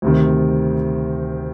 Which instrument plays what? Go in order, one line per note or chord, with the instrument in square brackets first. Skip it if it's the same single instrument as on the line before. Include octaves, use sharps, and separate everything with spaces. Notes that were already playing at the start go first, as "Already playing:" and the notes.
[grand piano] D2 C3 D#3